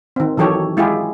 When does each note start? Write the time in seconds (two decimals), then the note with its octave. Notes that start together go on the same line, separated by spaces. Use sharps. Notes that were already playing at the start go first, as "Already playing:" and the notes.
0.16 D#3 C4
0.37 D#3 E3 F#3 G4 A4 C#5
0.77 G#3 E4 F4 G4 G#4